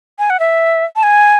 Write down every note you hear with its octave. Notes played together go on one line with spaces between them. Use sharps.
G#5
F#5
E5
A5
G#5